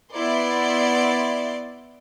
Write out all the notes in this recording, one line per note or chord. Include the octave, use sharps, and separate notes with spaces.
B3 E4 D5 C6